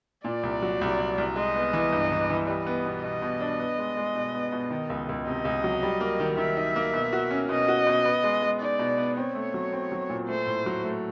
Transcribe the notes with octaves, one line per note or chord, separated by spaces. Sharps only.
A#2 D5
C2
F#3
C2
C2
C2
G#3 D#5
B3
E3
G2
E3
E3
G3 D#5
B3
B2
B2 D#5
B2
D4
B3
G#3
G#3
B2
B3
B2
D#3
C#2
C#2
C3 D#5
C#2
F#3
G3
A#3
D#3
D#3 E5
D#4
A#3
B2
F#4
C#4
B2 D#5
F#4
B2
B3
G#3
G#3
D#4 D5
B2
B3
C4 C#5
A3
F#3
C4
F#3
A#2
A3 C5
A2
F#3
A3